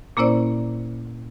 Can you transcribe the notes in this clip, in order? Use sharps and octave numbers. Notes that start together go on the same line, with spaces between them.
A#2 A#3 C#4 E4 C5 D5